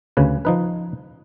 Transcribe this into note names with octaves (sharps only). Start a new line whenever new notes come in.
D2 C#3 B4
F3 D#4 B4